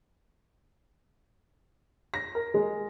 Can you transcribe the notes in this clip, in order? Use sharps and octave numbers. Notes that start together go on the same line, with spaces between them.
A#6
A#4
G#3